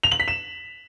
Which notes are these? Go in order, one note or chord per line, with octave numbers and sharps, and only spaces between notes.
F7
F#7
B6
E7